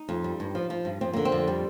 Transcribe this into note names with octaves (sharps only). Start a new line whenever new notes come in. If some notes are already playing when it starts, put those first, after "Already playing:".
Already playing: D#4
F2
G3
G2
F3
F3
G2
F2 C4
D3 A#3
C4
F2
G3